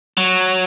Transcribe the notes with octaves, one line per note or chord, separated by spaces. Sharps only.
F#3